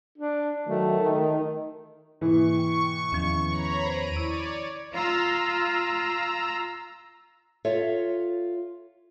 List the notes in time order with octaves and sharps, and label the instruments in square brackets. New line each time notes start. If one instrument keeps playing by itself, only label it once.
[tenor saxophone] D4
[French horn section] D#3 F#3 [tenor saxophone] A3
[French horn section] D#3
[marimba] G#2 B2 A#3 [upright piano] E3 [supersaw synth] C#6
[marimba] G5
[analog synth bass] E2 [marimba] D#3 F3 C#4
[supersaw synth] C#5 A#5 B5
[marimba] C5 [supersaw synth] D7 D#7
[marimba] E4 [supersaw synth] C#5 D5
[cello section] F4 [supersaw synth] A#5 E6
[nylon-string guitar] F4 A4 C#5 E5